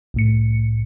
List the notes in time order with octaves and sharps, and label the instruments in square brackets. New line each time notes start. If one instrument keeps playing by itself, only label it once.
[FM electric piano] C2 A2 C#7